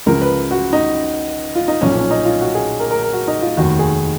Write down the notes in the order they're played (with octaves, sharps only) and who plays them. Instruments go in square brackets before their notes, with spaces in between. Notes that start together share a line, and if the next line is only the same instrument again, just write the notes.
[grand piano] C#2 C#3 F3 A#4
B4
F#4
D#4
F4
D#4
B1 A#2 F3 C#4
C#4
D#4
F4
F#4
G#4
A#4
A#4
A#4
F#4
D#4
F4
F1 D#2 D#3 F#4
G#4